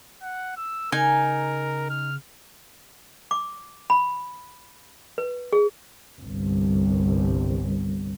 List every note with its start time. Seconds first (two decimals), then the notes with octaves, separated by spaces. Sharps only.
0.23 F#5
0.57 E6
0.92 C#3 D#4 A#4 G#5
1.90 F6
3.31 D6
3.90 B5
5.18 B4
5.53 G#4
6.22 G1 C2